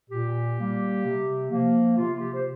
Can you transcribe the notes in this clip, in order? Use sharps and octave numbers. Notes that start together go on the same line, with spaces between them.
A#2 G4
G3 A#3
C3
F3 A#3
C3 F4
G4
C5